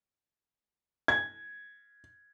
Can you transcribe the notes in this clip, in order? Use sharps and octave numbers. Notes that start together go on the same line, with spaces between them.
G#6